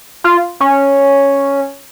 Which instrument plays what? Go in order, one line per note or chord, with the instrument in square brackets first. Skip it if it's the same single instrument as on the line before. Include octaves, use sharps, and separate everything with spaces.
[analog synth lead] F4
C#4